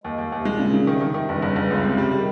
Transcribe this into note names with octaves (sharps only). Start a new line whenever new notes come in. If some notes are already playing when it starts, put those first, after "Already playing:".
D#2 G#3
D#2
D#2 C3
A#2 G#3
C#3
C#3
C3 D#3
D#3
C3
D#3
G1 C#3
G1
G1
C#2
C3
G3
D#3 G3